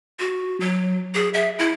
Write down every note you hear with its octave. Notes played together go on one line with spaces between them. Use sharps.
F#4
F#3
G#4
E5
E4